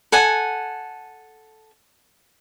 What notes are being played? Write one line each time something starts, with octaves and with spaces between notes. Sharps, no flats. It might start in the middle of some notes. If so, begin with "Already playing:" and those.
A4 F#5 G#5